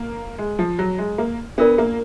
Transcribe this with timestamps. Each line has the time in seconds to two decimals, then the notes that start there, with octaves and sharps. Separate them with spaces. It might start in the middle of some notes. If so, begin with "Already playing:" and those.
Already playing: A#3
0.38 G#3
0.59 F3
0.79 F#3
0.98 G#3
1.18 A#3
1.58 B3 D4 F4 A#4 D5
1.78 A#3